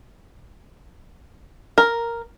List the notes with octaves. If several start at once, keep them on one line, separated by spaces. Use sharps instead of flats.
A#4